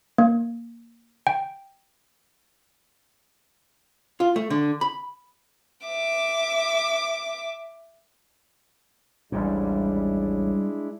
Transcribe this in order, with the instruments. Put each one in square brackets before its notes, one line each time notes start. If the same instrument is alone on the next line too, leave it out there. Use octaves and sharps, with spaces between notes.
[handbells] A#3
G5
[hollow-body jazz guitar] F4
A3
D3
B5
[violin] E5 D6
[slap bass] A1 D#2 G#2 [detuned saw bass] G3 [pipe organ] G#3 D4 E4